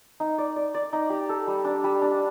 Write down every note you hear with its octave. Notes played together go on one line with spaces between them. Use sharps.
D#4
D5
D5
D5
D#4
G4
A4
G3
D4
G3
D4